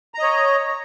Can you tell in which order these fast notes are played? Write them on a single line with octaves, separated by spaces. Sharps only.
A#5 D#5 C#5